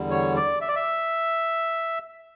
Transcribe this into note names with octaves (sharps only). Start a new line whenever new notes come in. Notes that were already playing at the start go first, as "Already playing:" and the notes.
Already playing: E2 D3 G3
C#5
D5
E5
D5
E5